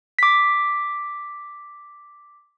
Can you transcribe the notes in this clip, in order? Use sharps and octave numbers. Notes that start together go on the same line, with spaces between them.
D6 B6